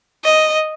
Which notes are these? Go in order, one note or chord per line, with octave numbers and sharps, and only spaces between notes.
D#5